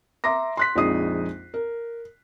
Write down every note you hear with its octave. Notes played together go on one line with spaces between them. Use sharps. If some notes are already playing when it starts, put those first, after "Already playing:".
E5 A#5 C6 D6 A#6
C6 F#6 B6
A#1 F2 G#3 D#4 D#6 C7
A#4